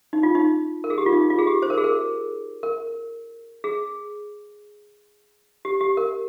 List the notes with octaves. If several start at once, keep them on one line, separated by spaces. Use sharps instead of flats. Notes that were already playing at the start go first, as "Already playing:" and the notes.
D#4
F4
D#4
A#4
G#4
G4
F4
D#4
F4
G#4
G4
C5
A#4
G#4
A#4
A#4
G#4
G4
G4
A#4